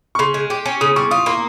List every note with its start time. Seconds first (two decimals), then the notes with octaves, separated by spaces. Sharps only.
0.15 C#6
0.19 C#3 C6
0.34 G#3
0.50 G4
0.66 C#4
0.81 C#3 D#6
0.96 G3 C#6
1.11 F4 D#6
1.26 A#3 C6